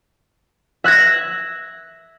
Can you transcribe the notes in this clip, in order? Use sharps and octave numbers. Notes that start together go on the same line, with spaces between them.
E5 F#6 G#6 A#6